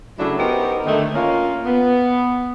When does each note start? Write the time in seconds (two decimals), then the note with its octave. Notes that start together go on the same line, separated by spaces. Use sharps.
0.19 C#3 F#3 A3 D4 E4
0.39 B3 D#4 F#4 G4 A#4 C5
0.86 D3 D#3 A3
1.14 A#3 C#4 F4
1.66 B3